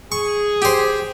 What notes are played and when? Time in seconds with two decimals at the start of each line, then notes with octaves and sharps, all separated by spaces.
0.12 G#4 C#6
0.62 G4 C5